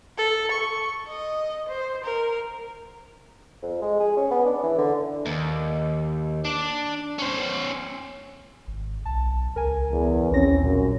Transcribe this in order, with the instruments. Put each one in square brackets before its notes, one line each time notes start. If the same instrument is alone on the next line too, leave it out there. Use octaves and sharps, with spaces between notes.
[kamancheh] A4
C#6
D#5
C5
A#4
[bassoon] F2
G#3
G#4
C#4
B3
D4
E3
D3
[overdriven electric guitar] D#2
D4
C#4 C5
[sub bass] G#1
[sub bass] B1 [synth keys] A5
[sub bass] C#2 [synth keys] A#4 G#5
[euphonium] E2
[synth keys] A#1 C4 A#6 [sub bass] D#2 [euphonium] C#4
[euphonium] F#2 [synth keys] A#2